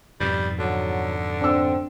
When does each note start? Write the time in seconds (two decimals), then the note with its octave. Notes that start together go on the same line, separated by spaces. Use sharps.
0.20 F2 G#2 B2 G3
0.59 D3 F#3
1.41 C4 D4 E6